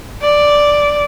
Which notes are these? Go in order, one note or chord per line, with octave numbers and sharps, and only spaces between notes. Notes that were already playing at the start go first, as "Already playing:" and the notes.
D5